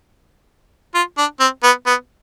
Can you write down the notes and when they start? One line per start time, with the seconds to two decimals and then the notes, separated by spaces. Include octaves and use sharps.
0.95 F4
1.18 D4
1.40 C4
1.64 B3
1.87 B3